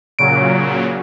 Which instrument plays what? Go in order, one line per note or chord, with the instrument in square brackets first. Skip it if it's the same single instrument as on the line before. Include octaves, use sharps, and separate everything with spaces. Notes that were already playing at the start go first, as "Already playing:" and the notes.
[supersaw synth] A#2 C#3 F#3 [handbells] D7